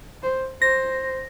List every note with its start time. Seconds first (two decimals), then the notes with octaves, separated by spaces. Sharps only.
0.23 C5
0.61 C5 A#6